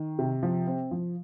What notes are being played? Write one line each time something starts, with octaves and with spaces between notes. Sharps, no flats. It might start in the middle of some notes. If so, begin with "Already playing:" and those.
Already playing: D#3
C3
F3
C4
F3